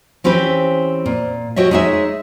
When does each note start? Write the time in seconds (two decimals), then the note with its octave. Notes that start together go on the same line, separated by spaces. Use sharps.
0.24 E3 C4 C#4 G4 B4
1.06 A#2
1.56 F#4 G4 C#5 D#5 E5
1.71 G#3 D#4 G#4 C#5 E5